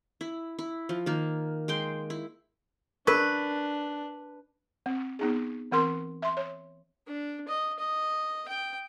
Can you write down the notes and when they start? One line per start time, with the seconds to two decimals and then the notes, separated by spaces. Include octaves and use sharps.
0.21 E4
0.59 E4
0.89 F3
1.06 D#3 A#3
1.68 G#3 G5 C6
2.10 E4
3.07 D4 A#4 B4 C#6
4.86 C4
5.19 B3 D#4 G#4
5.72 E3 C4 A#4 C6
6.22 E5 C6
6.37 C#5
7.07 D4
7.48 D#5
7.79 D#5
8.48 G5